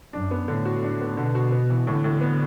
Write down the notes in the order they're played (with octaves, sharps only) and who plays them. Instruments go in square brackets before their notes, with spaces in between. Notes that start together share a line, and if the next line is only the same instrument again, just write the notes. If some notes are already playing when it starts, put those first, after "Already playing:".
[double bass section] F#2 [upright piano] D4
[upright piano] B3
[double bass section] A2 [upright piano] D3
[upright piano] F#4
D4
B3
[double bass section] B2 [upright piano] D3
[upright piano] F#4
B3
E3
[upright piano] A2 [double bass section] D3
[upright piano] A2
B3